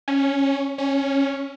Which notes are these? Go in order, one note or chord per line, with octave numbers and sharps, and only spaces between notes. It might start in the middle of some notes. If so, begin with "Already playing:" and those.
C#4
C#4